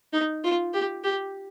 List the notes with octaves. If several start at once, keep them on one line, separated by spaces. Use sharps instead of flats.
D#4
F4
G4
G4